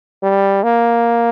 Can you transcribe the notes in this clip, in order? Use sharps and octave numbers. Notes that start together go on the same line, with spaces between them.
G3
A#3